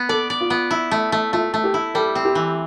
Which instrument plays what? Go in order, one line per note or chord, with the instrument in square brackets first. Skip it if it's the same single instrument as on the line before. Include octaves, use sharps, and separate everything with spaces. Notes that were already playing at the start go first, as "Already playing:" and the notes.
Already playing: [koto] B3
[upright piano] A4 [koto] D5
[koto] D5
[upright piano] F4
[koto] B3
E4
A3
A3
[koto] A3 [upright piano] F4
[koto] A3
[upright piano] G4
[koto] E4
[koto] G3 [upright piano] A4
[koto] C4
[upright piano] G4
[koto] E3